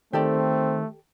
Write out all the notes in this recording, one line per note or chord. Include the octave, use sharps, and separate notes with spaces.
D#3 A3 C4 G4 A4 D5